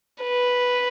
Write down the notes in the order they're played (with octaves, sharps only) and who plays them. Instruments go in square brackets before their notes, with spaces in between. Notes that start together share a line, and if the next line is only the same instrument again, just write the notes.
[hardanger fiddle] B4